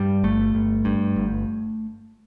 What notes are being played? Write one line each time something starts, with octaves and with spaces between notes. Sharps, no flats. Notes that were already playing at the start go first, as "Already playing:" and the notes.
Already playing: G2 G3
G1 A3
G1
G2
G1